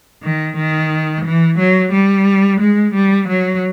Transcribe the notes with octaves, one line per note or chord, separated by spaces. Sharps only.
D#3
D#3
E3
F#3
G3
G#3
G3
F#3